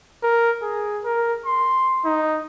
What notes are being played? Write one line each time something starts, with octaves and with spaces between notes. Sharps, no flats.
A#4
G#4
A#4
C6
D#4